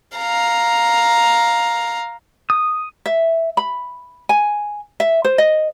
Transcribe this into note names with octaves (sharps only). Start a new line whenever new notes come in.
F5 A#5
D#6
E5
B5
G#5
E5
C5
D#5